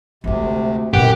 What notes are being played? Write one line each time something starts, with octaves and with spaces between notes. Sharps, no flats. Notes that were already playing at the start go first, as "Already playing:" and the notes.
D2 C3 G#3 A3
F#2 A#2 E3 G4 F#5